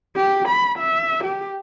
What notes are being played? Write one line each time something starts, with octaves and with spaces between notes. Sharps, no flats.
G4
B5
E5
G4